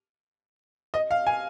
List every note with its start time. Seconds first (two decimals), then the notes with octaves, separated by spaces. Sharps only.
0.94 D#5
1.11 F5
1.27 G#5